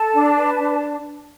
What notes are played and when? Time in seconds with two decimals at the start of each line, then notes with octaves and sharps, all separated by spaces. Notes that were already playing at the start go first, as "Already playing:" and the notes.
Already playing: A4 A5
0.13 D4
0.37 B4
0.59 D4